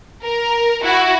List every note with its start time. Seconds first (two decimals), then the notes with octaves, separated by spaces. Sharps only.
0.24 A#4
0.82 E4 F#4